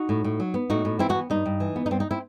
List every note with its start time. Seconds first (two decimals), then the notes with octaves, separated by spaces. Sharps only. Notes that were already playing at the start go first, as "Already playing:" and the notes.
Already playing: D#4 F#4
0.09 A2
0.24 A2
0.40 F#3
0.54 B3
0.70 A2 D#4 F#4
0.85 A2
0.99 E3 C4 E4
1.09 D#4 F#4
1.15 B3
1.30 G2 D#4
1.46 G2
1.60 E3
1.76 B3
1.86 D#4
1.91 G2 C4
2.00 D#4
2.11 C4 E4